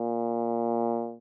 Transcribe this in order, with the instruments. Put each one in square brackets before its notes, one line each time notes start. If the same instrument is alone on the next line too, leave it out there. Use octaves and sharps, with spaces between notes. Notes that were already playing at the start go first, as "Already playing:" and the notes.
Already playing: [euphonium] A#2